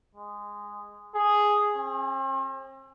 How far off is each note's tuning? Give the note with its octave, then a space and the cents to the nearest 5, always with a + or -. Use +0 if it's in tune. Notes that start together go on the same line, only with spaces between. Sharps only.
G#3 -10
G#4 +0
C4 +45